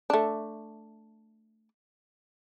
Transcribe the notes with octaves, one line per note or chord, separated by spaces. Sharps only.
A3 D4